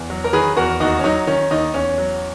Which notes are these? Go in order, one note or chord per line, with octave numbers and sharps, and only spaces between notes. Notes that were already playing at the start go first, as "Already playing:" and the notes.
Already playing: E2
F#3
A#4
D#3 G#4 B4
E2 F#4 A#4
D#2 D#4 F#4
C#4
F#3 D#4
D#3 C#4
D#2 D#4
E2 C#4
F#3